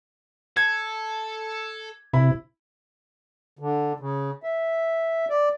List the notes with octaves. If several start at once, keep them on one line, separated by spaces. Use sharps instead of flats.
A4 G#6
C3 E4 B5
D3
C#3
E5
D5